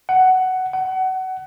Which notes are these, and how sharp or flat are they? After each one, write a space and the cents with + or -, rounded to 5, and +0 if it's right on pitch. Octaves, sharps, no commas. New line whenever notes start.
F#5 +10
F#5 +25